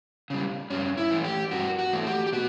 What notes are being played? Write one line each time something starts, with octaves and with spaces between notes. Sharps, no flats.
C#3 G3
G2 C#4
E4
E3 A3
G4
G2 F#4
F#4
E3 A3
G4
G4
B2 F#4